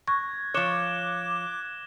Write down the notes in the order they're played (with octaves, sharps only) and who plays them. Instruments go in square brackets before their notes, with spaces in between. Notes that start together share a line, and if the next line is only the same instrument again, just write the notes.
[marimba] C#6 [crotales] F#6 G#6 A#6
[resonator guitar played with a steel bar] F3 C#5 [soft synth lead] D6 [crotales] F#6 E7 G7